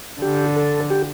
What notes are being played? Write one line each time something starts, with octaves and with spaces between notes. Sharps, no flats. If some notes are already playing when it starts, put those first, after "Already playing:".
D3 G4
A4
G4